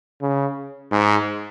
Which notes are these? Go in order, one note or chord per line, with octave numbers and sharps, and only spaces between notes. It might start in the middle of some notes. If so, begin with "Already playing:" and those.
C#3
G#2